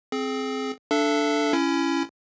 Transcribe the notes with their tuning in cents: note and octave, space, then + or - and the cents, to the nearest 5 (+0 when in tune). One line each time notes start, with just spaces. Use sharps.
C4 +5 G#4 +30
D4 +0 A4 +0 E5 +40
C#4 +0 E4 +25